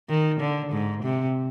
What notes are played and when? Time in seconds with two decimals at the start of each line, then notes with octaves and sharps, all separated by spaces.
0.09 D#3
0.40 D3
0.72 G#2
1.03 C3